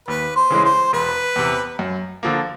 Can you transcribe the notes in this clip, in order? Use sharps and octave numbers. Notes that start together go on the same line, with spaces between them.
D#2 B4
C5
C#3 E3 G#3
C5
E1 B4
E2 C3
F#2
D3 F3 A#3